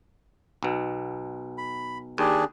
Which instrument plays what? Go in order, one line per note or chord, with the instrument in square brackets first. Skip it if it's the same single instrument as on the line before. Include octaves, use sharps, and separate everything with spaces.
[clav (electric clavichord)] B1 B2
[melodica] B5
[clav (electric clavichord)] D#2 [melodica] D4 G4 G#4